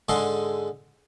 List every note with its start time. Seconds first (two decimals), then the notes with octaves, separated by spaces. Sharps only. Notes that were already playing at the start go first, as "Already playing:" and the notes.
0.09 G#2 D3 G#3 A4 C6